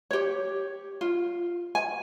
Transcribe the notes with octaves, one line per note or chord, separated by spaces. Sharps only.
G4 C#5
F4
G#5